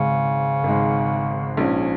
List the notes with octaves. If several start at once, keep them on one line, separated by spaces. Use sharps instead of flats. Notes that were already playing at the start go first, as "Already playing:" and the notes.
Already playing: G#1 G#2 C#3 G#3
G#1 G#2 G#3
A#1 G#2 F3 C#4